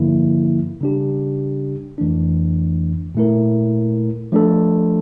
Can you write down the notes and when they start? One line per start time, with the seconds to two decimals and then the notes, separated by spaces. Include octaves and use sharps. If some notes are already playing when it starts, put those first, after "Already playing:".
Already playing: G2 D3 F3 A#3 E4
0.81 C#3 G3 D4 G4
1.98 F2 E3 A3 D4
3.15 A#2 A3 E4 A#4
4.32 F3 A3 D4 A4